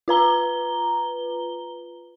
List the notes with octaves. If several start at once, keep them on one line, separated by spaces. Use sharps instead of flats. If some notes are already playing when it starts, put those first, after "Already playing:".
F4 B4 A#5 G7